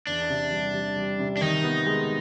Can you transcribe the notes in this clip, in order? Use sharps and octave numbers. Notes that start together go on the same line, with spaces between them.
E2 D4
C3
G3
G3
G3
C3
D4
D#3 D#4
B3
G#3